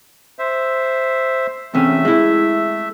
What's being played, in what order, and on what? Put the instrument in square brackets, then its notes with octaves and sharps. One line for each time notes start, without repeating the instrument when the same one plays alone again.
[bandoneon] C5 E5
[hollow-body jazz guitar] E2 C3 C#4 [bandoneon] A3 E5
[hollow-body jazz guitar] G#3 E4